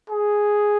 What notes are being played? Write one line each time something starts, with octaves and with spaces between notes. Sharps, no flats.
G#4